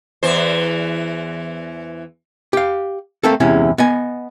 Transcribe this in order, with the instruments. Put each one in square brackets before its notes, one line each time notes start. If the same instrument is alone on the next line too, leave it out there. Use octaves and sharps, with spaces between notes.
[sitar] E2 E3 C5
[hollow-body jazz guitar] G4 F5
A3 A#3 C4 A4
E2 C3 G#3 C#4 E4
B3 D#5 G#5